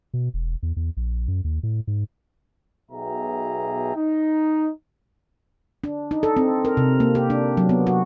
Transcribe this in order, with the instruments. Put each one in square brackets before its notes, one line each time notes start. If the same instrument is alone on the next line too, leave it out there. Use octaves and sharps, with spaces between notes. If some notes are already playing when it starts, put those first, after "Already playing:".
[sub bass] B2
E1
E2
E2
A#1
F#2
D#2
A2
G#2
[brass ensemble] B1 B2 G#4 E5 G5 A#5
D#4
[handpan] D4
D#4
A4
C4
A#4
C3
A#3
G4
D4
F#3
B3
F#4